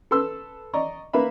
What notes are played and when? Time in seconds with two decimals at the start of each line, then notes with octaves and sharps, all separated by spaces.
0.11 A4 B4 C6 E6
0.74 D5 D#5 A#5 C#6
1.13 A#3 B4 E5 B5